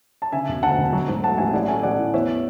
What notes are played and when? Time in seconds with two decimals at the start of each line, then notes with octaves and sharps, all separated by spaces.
0.22 A5
0.32 C#3 E5 G#5
0.48 E1
0.63 D2 F#5 A5
0.78 E1
0.93 F#3
1.08 G#2
1.23 A3 F#5 A5
1.38 A1 E5 G#5
1.53 A1 D5 F#5
1.68 A3 E5 G#5
1.83 A1 D5 F#5
1.98 A2
2.14 E2 C#5 E5